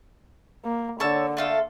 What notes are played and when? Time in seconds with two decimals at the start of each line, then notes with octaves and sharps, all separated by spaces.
0.65 A#3
1.00 D3 C#5 A5 E6
1.37 A3 F4 A4